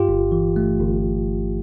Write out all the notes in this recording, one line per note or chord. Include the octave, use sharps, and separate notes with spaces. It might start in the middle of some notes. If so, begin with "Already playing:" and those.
Already playing: G2 F4 G4
G1
E3
A3
G1